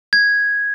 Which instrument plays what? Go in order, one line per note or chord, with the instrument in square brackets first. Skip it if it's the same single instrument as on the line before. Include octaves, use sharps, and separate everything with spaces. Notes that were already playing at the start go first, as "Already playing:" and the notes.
[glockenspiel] G#6